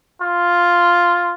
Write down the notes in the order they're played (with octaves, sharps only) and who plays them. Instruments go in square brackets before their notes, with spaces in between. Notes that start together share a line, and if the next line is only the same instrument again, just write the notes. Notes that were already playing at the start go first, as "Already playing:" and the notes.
[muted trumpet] F4